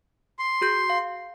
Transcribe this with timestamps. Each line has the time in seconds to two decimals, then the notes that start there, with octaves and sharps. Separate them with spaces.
0.39 C6
0.61 F#4 G#4 G6
0.90 F5